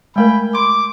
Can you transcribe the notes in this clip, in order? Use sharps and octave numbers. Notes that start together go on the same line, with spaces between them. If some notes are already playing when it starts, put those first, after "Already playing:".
G#3 A3 A#4 G5 G#5 B5
C6 D6